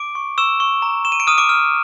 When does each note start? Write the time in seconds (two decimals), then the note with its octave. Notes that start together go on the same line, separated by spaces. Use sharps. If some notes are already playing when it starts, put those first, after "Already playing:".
Already playing: D6 D7
0.15 C#6
0.38 C#6 E6 E7
0.60 C#6
0.82 A#5
1.05 C#6 E7
1.12 D#7
1.20 D7
1.27 D#6 F6 D#7
1.38 D6 D7
1.49 F6